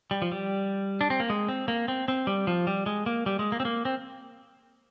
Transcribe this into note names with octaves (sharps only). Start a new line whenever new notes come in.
G3
F3
G3
D4
C4
A#3
G#3
C4
A#3
C4
C4
G3
F3
G3
G#3
A#3
G3
G#3
A#3
C4
A#3
C4